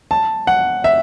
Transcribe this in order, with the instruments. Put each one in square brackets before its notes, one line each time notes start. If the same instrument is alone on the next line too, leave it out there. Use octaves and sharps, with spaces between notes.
[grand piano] A5
F#5
E5